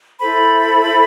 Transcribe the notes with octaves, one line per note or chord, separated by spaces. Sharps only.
E4 A4 C5 B5